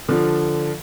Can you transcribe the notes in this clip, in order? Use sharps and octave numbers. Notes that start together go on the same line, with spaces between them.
D3 F3